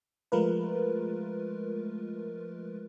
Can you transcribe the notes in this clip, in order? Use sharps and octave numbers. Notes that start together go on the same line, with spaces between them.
F3 G#3 A3 F4 A#4 B4